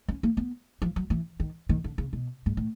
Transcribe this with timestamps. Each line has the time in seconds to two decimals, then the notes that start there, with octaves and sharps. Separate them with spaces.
0.08 C#4
0.23 A#3
0.37 B3
0.82 F3
0.96 F#3
1.10 E3
1.40 D#3
1.69 D#3
1.84 D3
1.98 C#3
2.13 B2
2.46 G#2
2.57 A2